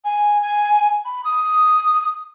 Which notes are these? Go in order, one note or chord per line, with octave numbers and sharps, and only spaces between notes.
G#5
G#5
B5
D#6